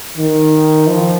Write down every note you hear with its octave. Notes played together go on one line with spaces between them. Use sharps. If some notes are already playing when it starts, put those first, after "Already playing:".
D#3
F3